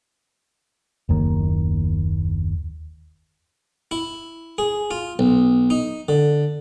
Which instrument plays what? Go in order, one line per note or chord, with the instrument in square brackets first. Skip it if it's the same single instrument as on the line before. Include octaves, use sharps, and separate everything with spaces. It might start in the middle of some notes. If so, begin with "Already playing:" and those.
[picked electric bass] F#1 D#2 D#3
[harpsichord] E4
G#4
F4
B1
D#4
D3